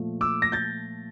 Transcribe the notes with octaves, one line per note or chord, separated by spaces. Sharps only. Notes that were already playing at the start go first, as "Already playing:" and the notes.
Already playing: A#2 F3 A3
D6 E6
A#6
G6 A6